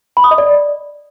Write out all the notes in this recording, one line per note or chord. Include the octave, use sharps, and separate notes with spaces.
B5
D#6
D#5
D5